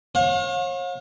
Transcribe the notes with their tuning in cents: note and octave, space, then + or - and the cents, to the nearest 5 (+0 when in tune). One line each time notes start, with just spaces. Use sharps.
C#5 -40 F5 +40